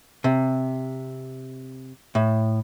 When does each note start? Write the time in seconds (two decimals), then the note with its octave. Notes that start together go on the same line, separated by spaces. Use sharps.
0.24 C3
2.15 A2